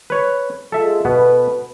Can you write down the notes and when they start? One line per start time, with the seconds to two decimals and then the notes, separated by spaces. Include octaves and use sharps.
0.10 B4 C#5
0.72 G#3 F4 G#4 A4 E5
1.05 D2 B2 B3 B4